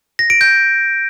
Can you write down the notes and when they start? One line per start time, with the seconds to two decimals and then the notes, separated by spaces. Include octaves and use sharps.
0.19 A#6
0.30 D7
0.41 G6